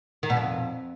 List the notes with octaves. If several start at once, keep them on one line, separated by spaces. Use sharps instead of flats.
D#3
B2
F2